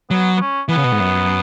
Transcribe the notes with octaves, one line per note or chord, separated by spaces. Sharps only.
F#3 B3
B3
C#4
E3 B3
C#3
B2
G#2
F#2